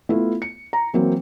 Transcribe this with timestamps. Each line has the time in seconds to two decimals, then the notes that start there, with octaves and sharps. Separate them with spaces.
0.09 A3 B3 E4 F4
0.42 C#7
0.73 A#5
0.94 E3 F#3 A#3 C4